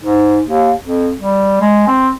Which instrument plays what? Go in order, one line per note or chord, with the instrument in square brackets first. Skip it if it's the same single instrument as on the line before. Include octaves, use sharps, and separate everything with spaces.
[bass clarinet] G#2
D#2
F2
G3
G#3
C4